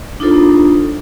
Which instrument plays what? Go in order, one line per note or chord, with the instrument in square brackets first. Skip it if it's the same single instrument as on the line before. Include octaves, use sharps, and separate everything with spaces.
[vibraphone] D4 D#4 F4 A4 C5